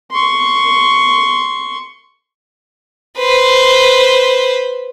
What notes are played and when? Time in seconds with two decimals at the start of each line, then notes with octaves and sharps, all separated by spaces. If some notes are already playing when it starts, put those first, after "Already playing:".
0.11 C6 C#6
3.18 B4 C5